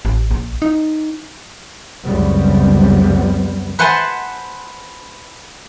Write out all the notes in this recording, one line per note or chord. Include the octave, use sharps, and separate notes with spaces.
A1
A#1
D#4
C#2 F#2 C#3 G3 B3 C4
B4 C5 F#5 G#5 A5 C6